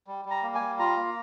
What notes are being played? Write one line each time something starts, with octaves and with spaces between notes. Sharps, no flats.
G3
G3
A#5
A#3
G#5
G3
F4 A#5
A#3